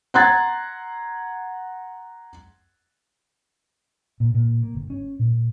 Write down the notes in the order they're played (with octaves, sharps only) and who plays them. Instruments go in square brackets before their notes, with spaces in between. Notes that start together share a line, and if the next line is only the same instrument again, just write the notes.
[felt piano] F#5 A#5 C6 F#6 G#6 A6
[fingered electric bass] A#2
A#2
A#3
G1
C#4
A#2